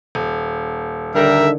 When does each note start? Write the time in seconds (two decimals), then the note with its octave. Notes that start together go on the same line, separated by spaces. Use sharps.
0.15 D#1
1.15 D3 D#3 G3 A#4 E5